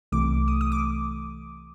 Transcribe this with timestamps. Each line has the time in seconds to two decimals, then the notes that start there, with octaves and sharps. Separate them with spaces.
0.12 C2 C3 E3 A3 D6
0.48 D#6
0.61 D#6
0.72 D6